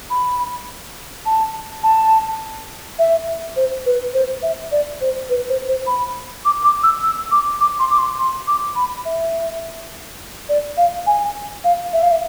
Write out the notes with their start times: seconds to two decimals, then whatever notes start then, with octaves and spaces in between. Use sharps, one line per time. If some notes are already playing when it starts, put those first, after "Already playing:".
0.10 B5
1.26 A5
1.83 A5
2.99 E5
3.56 C5
3.86 B4
4.14 C5
4.43 E5
4.72 D5
5.01 C5
5.30 B4
5.49 C5
5.69 C5
5.87 B5
6.45 D6
6.64 D6
6.83 E6
7.02 E6
7.31 D6
7.60 D6
7.79 C6
7.91 D6
7.99 C6
8.19 C6
8.47 D6
8.76 B5
9.05 E5
10.49 D5
10.77 F5
11.07 G#5
11.64 F5
11.93 E5
12.03 F5
12.12 E5